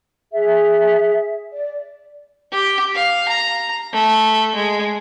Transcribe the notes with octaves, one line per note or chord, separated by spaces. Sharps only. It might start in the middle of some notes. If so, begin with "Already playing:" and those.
G#4 E5
D5
G4
F5
A#5
A3
G#3